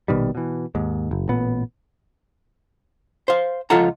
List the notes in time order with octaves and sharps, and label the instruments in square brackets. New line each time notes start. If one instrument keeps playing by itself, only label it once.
[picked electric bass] A#1 B2 D#3 G3
B2 E3
D#2 G#2
F#1
A1 A#2 B3
[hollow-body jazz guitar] C5 F5
C#2 F3 F4 A4 F#5 A#5